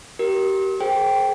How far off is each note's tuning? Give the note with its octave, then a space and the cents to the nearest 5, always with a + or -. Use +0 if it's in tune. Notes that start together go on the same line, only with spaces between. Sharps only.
G4 -25 A#4 +0
G#4 +35 C5 +5 G5 -5